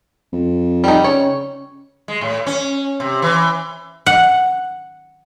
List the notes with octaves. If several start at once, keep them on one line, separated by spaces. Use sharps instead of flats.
F2
G3 D#4
C#3 C#5
G#3
A2
C#4
C3
E3
F#5